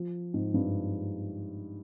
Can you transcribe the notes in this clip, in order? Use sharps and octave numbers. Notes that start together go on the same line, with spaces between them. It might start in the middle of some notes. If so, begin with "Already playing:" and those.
Already playing: F3
G#2
G2